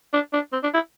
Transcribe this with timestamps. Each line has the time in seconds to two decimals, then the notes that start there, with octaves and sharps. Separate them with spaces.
0.13 D4
0.33 D4
0.53 C4
0.63 D4
0.74 E4